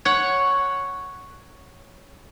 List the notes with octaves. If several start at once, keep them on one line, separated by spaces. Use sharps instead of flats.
C#5 F#5